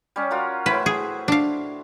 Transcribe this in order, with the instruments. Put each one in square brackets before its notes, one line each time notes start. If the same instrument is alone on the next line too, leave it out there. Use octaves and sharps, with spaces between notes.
[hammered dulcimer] G3 C#4
F4 F#4 A#4
[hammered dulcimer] A2 E4 C5 [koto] B4
[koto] G#4
D4 F5